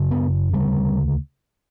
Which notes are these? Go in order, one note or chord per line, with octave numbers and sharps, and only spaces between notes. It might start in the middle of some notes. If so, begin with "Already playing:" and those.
Already playing: F#2 C#3
B3
D2 C#3 G3